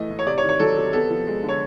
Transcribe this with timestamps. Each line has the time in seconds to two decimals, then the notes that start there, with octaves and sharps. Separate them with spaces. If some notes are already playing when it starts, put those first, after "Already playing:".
Already playing: A2 E3 A3 D#5
0.10 A2
0.19 C#5
0.26 C3 D5
0.38 C#5
0.43 D#3
0.49 C#5
0.59 F#3 A4
0.77 C3
0.93 B3 A4
1.10 F3
1.27 G#3
1.43 D3
1.49 C#5